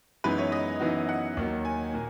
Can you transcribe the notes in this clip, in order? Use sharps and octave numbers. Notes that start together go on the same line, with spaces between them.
F#2 E3 G#3 B3 D#4 B4
C#5
D#5
F#2 E3 B3 D#4 F#4
F#5
D#2 D#3 F#3
G#5
A#2 A#3